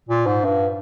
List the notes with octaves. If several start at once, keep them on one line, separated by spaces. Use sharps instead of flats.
A#2
G#2
G2